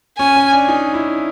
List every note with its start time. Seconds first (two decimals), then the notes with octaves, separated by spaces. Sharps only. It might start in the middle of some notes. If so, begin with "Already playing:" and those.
0.18 C#4 G#5
0.36 C#4
0.53 D4
0.68 D#4
0.94 E4